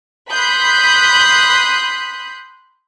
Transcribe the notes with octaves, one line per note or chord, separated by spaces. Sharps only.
B5 C6 D#6 F#6 G6 B6